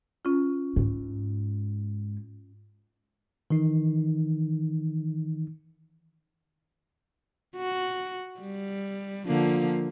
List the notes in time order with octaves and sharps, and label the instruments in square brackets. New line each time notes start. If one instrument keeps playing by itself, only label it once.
[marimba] C#4 F4
[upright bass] G#2
[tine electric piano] D#3 E3 D#4
[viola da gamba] F#4
G3
D3 F3 A#3